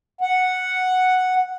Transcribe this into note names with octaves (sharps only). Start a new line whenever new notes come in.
F#5